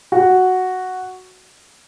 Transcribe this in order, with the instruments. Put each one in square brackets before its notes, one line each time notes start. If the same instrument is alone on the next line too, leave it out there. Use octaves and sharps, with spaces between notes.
[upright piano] F#4